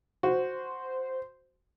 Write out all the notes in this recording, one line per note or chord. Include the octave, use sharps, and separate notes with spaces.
F#4 C5